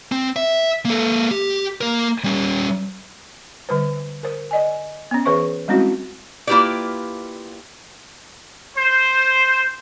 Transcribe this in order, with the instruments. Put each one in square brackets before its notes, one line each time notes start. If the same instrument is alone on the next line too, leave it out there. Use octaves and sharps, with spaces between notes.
[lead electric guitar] C4
E5
A#3 A4
G4
A#3 A#4
G3 C#4
[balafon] D3 G3 B4 C5
A#4 C5
D5 D#5 G#5
B3 C#4
E3 G#4 B4 C5 E5 C#6
G3 G#3 C4 C#4 E4 F#4
[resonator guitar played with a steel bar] A#3 E4 F4 G4 B4 D5
[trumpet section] C5